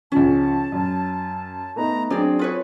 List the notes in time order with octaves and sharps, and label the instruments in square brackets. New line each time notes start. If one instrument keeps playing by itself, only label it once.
[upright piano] C#2 F3 [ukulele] C#4 [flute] A5
[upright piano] F#2
[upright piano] A3 B3 D#4 [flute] A#5
[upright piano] F#3 C4 [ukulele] D4 D5 [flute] G#4
[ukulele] F4 B4 C#5